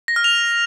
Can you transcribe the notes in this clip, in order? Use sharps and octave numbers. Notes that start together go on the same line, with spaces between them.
A#6
F6
F7